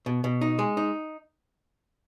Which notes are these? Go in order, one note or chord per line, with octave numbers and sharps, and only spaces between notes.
B2
B2
D#4
G#3
D#4